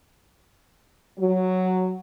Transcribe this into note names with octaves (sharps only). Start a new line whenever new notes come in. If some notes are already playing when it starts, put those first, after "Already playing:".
F#3